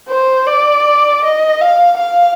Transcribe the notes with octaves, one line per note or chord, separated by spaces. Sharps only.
C5
D5
D#5
F5
F5